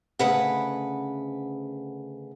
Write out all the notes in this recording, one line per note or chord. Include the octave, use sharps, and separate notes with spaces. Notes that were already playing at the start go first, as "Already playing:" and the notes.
D2 C#3 B4 F#5